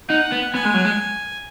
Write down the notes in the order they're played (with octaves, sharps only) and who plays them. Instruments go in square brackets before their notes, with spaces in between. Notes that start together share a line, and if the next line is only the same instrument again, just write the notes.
[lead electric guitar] D#4 [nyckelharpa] F#5
[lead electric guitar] B3
[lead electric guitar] B3 [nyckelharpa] G#5
[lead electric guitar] G#3
F#3
G#3